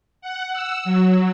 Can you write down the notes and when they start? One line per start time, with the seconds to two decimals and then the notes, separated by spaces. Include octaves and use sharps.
0.21 F#5
0.53 E6
0.85 F#3